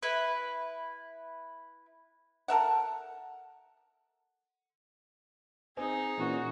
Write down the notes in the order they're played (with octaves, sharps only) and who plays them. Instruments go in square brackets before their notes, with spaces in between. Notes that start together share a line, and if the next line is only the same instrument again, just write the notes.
[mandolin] E4 B4
[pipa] A4 A#4 E5 F#5
[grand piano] C4 G#5 [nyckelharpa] D#4 G#4
[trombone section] A#2 E3 C#4 [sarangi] F#4